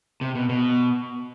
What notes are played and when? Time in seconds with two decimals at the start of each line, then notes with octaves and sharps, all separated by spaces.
0.21 C3
0.35 B2
0.49 B2